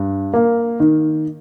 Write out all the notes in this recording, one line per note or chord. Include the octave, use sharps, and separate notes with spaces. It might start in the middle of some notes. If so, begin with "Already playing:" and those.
Already playing: G2
A#3
D#3